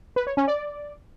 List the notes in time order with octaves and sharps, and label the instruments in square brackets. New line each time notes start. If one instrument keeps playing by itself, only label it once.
[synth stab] B4
C#5
C#4
D5